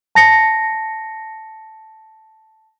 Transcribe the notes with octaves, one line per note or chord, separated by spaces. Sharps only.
A5 A#6 C#7